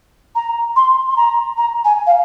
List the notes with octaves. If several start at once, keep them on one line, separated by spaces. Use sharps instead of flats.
A#5
C6
C6
A#5
A#5
G#5
F5